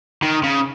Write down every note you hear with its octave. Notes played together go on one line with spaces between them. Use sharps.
D#3
C#3